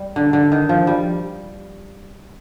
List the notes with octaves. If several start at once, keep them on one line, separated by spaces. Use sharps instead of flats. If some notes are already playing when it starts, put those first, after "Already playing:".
Already playing: G3
D3
D3
D#3
F3
G3